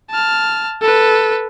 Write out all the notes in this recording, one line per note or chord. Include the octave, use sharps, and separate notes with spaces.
A5 F6
A4 B4